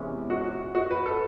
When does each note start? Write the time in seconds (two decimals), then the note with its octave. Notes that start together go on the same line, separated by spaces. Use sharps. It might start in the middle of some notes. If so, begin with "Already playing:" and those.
Already playing: E2 C3 E3 G#3 C#4
0.30 F#4
0.75 F#4
0.91 B4
1.06 A4